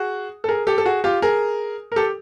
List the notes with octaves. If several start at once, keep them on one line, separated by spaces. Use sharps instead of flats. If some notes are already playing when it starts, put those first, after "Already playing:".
Already playing: F#4 G#4
A4
G#4 A#4
G4 A4
A4
F#4 G#4
F4 G4
G#4 A#4
A#4
G4 A4